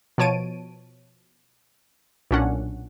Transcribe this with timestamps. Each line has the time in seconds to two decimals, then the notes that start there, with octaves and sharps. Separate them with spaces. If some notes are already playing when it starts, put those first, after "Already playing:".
0.18 B2 F3 C#5 A5 D7 D#7
2.31 B1 A#2 C#4 D4 F#5